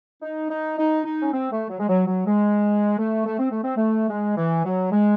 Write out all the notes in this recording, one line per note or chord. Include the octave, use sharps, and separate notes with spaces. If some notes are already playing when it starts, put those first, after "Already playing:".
D#4
D#4
D#4
D#4
C#4
C4
A3
F#3
G#3
F#3
F#3
G#3
A3
A3
C4
A3
C4
A3
G#3
E3
F#3
G#3